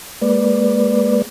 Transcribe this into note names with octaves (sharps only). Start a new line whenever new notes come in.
G#3 A#3 B4 D5